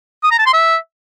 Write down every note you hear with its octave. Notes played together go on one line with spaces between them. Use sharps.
D#6
A#5
A5
C6
E5